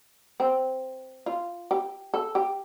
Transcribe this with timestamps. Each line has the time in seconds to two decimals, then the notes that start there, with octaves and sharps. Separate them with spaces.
0.40 C4
1.26 F4
1.71 G4
2.14 A4
2.35 G4